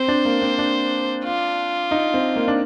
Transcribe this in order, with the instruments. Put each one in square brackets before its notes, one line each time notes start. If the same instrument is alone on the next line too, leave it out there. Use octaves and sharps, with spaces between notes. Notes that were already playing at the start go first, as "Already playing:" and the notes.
Already playing: [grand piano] C4 [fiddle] C5
[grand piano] D4
A#3
C4
D4
[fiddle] F4
[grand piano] D#4
C4
A#3
D4